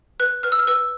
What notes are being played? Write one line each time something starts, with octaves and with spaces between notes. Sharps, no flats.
B4 F#6
B4 F6
E6
F6
B4 E6